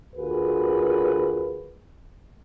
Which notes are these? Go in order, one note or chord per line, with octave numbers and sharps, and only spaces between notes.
D2 F4 F#4 G#4 A#4 B4